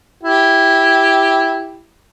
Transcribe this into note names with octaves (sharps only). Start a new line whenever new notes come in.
E4 G4